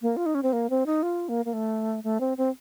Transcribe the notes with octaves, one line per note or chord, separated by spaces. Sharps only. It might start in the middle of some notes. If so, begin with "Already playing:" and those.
A#3
F4
D#4
C#4
C4
A#3
C4
D#4
F4
A#3
A#3
A3
A3
C4
C4